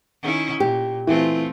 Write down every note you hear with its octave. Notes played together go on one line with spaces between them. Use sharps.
D#3 C#4 E4
A#2 G4
E3 A3 C4 F4